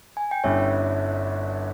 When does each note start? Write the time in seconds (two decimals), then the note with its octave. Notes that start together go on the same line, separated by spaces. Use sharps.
0.17 G#5
0.31 G5
0.44 G1 G2 G3 C#4 E4 C#5 E5